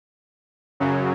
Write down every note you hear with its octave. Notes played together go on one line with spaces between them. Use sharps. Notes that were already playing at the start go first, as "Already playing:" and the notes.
F#2 C#3 F#3